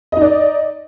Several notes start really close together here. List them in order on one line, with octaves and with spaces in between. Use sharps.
D#5 D#4 D5